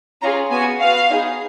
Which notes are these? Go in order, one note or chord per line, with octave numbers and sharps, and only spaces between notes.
C#4 F4 G#4 A#5
B3 F#4 G#5
B3 F#4 F5
B3 D#4 G#4